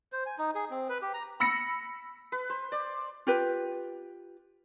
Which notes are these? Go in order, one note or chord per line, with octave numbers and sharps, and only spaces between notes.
C5
G#5
D#4
G#4
C4
B4
G4
A#5
B5 E6 A#6 C#7
B4
C5
D5
F4 G4 B4